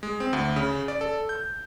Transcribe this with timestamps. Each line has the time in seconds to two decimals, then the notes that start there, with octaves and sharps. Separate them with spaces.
0.03 G#3
0.20 C4
0.33 D2
0.56 C#3
0.88 D5
1.01 A4
1.29 G6